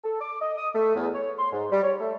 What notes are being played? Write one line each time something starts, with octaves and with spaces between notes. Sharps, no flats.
A4
D6
D#5
D#6
A3
E2
C#5
C6
G#2
G3
C#5
A3